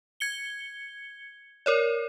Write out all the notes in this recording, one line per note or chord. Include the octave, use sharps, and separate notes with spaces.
G#6 C#7 G7
A#4 C#5 D5